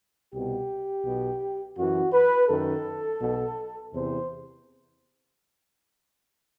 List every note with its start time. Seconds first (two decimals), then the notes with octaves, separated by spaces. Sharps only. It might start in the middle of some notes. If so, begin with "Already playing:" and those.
0.32 C2 B2 G4
1.04 B1 B2
1.76 F#2 E3 F#4
2.12 B4
2.48 F#2 D#3 A4
3.20 B1 B2
3.93 E2 C3 E3 C5